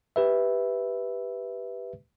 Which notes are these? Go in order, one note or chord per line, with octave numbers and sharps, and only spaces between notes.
G4 B4 E5